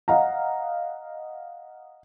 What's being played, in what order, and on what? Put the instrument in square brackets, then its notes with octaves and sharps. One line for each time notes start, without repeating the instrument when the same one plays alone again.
[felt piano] D#5 F5 F#5 A#5